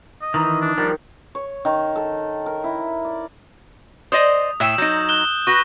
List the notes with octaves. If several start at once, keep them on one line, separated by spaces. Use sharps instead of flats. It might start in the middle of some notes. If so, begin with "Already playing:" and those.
D#5
D#3 E3 D#4
D4
D#3 F3 G3
C#5
D#3
A4
A#4
E4
D5
C5 D5 D#5 D#6
A2 E5 G5 E6 E7
F#3 D#4 G6
F#6 E7 G7
F#4 B4 C#6 A#6